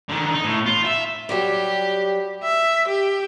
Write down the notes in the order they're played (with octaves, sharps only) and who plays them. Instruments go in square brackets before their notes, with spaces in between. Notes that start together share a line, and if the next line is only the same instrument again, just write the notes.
[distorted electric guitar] D3 D#3
D#4
A2
F4
E5
[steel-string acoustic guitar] F#3 G3 [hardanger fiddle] G4
[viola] E5
G4